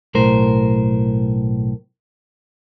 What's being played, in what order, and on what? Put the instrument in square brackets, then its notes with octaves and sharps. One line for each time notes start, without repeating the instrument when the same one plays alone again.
[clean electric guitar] B1 A2 A#4 C5